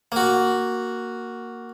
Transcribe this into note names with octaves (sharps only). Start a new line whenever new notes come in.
A#3 F#4